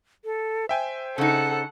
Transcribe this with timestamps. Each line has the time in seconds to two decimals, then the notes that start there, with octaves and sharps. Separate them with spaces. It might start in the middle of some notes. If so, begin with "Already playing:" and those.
0.25 A4
0.69 C5 E5 G5 G#5
1.18 C#3 D#4 A4 F#5